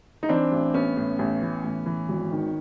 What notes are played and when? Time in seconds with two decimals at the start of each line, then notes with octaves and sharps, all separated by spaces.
0.23 D#4
0.29 E3 C4 D4
0.52 A1
0.74 A1 B3 C#4
0.97 A2
1.19 A1
1.42 E3
1.64 A2
1.86 E3
2.09 G#1
2.32 D#3